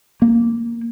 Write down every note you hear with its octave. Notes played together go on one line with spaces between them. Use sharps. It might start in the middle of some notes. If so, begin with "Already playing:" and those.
A#3